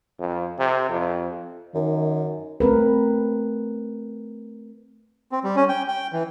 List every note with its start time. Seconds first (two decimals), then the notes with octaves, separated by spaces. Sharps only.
0.19 F2
0.59 C3
0.90 F2
1.75 F#2 D#3
2.60 A3 C4 A#4 B4
5.32 C4
5.44 G3
5.56 C#4
5.69 G5
5.88 G5
6.13 E3